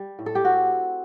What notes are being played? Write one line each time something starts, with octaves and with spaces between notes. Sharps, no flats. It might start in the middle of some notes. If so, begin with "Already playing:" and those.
Already playing: G3
A2
A4
G4
C4 F#4